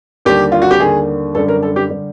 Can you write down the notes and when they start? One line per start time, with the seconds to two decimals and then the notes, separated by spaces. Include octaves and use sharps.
0.25 D#2 D3 G3 G4
0.52 F4
0.62 F#4
0.71 G4
0.80 D#2 D3 G3 G#4
1.35 F#2 D3 G3 A4
1.48 A#4
1.63 A4
1.76 G4
1.89 D3 G3